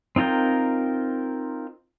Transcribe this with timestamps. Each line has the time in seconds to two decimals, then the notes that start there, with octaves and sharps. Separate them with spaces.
0.16 C4 D#4 F4 A#4 G5